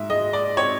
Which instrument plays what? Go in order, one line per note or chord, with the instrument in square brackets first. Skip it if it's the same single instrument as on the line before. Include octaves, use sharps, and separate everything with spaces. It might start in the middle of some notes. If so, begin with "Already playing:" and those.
Already playing: [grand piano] G#2 [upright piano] E5
[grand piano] G#3 [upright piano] D#5
[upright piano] D5
[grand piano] C4 [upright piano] C#5